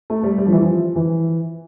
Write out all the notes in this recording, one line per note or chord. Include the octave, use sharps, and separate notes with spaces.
A3
G3
G3
F3
E3
F3
E3